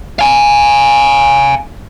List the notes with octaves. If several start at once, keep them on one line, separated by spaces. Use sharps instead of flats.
F5 G#5